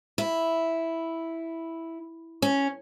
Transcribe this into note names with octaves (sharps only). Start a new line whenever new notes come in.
E4
C#4